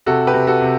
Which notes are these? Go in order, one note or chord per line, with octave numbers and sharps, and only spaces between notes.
C3 F#4 A4
G4 B4
C3
F#4 A4
C3